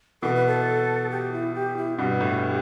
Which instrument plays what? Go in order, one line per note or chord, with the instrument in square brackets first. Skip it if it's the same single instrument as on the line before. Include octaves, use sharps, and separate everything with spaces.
[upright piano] B2 E3 [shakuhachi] A4
[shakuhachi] B4
A4
G4
E4
G4
E4
[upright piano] G2 B2 [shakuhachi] G4
[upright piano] A2